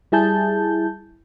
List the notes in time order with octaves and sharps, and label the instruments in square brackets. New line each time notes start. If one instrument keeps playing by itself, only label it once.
[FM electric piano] G3 E4 G#4 A5 G6